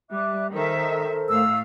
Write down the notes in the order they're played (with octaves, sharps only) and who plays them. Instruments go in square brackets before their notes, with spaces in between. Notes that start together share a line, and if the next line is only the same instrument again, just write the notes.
[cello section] G3 [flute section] E5 D6 F#6
[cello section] D#3 E5 [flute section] A4 A#4 C5
[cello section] A2 A3 F5 [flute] E6